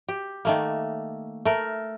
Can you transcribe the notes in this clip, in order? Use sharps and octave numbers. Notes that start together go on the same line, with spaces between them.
G4
D#3 A3 A#3
A3 A#4